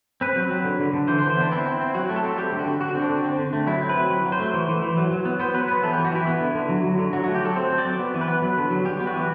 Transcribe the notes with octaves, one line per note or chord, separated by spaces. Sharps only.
C4 B4
F#3
F#3
D3
D3
D3
E3 C5
C5
E3
C5
B3 D4
C4 E4
C4
C4
F#3 F#4
A3
A4
C4
G3 G4
D3
F#4
D3
D3 F#4
C4
D4
D3
C4
D3
A3
F#3 E4
C4
B4
F#3
F#3
F#3
C5
A3
E3
E3
E3
F#3
F#3
B3
B3 C5
F#3 B4
B3 B4
E3 A4
E3 G4
F#4
E3 E4
B3
D3
D3
F#3
F#3
D3
F#3 F#4
A3 F#4
G4
F#3 A4
C4 C5
C4
D5
F#3
B3
E3
B4
B3
F#3
D3
F#3
G3 G4
B3
F#4
E3